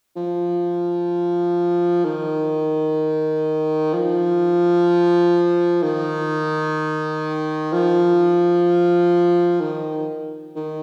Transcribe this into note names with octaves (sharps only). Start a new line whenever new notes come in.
F3
D#3
F3
D#3
F3
D#3
D#3